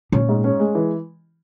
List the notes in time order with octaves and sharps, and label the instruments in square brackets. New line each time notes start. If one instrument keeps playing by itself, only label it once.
[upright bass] A#2 [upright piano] C#4
[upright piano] G#2
C#4
G#3
E3